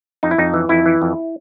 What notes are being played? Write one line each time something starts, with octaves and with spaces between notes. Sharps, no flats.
F2 D#4
E4
F2 D#4
E3
F2 E4
E3
F2